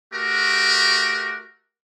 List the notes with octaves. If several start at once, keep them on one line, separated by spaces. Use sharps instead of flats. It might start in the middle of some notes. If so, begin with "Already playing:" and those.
A3 F#4 G4 A#4